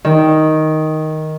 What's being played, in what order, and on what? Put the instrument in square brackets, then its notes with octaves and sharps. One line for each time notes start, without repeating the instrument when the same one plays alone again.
[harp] D#3